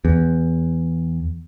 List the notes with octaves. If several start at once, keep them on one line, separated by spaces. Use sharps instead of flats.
E2